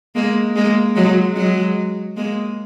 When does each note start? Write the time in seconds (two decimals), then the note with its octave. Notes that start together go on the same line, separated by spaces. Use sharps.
0.15 G#3 A#3
0.56 G#3 A#3
0.96 F#3 G#3
1.36 F#3 G#3
2.17 G#3 A#3